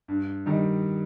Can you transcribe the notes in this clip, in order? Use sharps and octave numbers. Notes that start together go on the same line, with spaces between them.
G2
D#3 G3